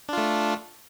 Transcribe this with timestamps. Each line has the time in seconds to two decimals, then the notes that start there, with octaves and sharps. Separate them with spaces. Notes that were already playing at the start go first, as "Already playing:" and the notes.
0.09 D4
0.13 F4
0.17 A3